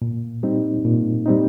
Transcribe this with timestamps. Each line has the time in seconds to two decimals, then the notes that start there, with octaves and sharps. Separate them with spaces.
0.02 A#2
0.43 G3 C4 D#4
0.85 A#2
1.26 G3 C4 D#4